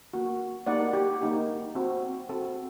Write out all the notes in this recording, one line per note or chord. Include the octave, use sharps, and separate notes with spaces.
A#3 F#4
A#3 D#4 G4 D5 F#5
G4
A#3 D#4 G4
C4 F#4
C4 F#4 A4